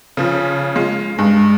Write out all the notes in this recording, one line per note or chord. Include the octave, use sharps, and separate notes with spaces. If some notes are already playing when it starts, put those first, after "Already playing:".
C#3 F3
G#3 F4
G2 G#3